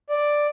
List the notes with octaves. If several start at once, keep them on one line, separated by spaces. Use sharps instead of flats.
D5